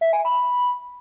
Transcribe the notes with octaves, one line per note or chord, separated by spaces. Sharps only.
E5
G#5
B5